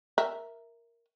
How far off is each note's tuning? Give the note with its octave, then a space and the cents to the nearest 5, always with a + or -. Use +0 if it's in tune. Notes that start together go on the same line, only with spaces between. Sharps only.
A#4 +0 E5 +0